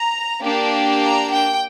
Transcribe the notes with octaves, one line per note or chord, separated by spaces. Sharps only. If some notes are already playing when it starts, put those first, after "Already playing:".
Already playing: A#5
A#3 D4 G4
A#5
G5